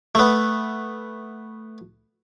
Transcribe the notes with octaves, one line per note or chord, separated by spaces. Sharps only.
A3 B3